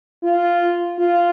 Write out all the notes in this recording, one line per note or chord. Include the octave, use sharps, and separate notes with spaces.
F4
F4